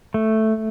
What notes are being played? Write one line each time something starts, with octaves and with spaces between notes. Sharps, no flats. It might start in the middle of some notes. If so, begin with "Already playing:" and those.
A3